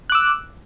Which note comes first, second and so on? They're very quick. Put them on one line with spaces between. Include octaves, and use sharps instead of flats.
F#6 D6 E6